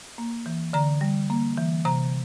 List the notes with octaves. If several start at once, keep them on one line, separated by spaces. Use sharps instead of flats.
A#3
E3
D3 A#5
G3
A#3
E3
C3 A#5